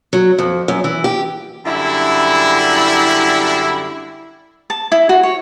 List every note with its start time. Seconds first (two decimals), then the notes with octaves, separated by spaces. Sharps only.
0.13 F#3
0.38 F2
0.68 F#2
0.84 E3
1.04 G4
1.66 F#2 D3 G3 E4
4.70 A5
4.92 E4
5.09 F#4
5.23 C#5